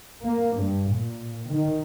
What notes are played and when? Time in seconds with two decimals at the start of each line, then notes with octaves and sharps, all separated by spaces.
0.24 A#3
0.61 G2
0.92 A#2
1.51 D#3